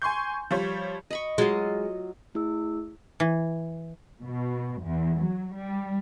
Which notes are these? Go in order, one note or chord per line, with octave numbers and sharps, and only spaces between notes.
G#5 C6 C#6 G6
F3 G3 C#5
D#5 B5 C#6
F#3 G#3 F4 D#5
A3 E4 G#4 E6
E3
B2
E2
F#3
G3